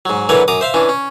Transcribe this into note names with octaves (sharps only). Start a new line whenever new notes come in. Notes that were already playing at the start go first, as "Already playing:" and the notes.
G#2 F#3
D3 E3 F#3 A#4 B4 C#5
F#2 A#5 D6 D#6
C5 E5 F5
E3 C#4 D4
C#4